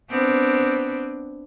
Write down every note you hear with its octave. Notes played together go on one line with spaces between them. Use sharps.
B3 C4 D4